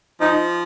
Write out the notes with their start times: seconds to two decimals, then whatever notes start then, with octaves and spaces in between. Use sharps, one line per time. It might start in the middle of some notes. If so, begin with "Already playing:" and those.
0.21 F3 D#4